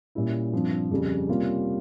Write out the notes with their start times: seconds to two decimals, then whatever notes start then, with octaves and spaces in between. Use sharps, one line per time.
0.15 A#2 G3 C#4 E4
0.52 G2 F3 C4
0.91 F2 C#3 G3
1.29 C3 G3 A#3 C#4 F4